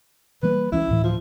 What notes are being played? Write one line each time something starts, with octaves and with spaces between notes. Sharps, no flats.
E3 G3 A#3 B4
C#2 E3 C#4 E4
D2 A2 E3
F3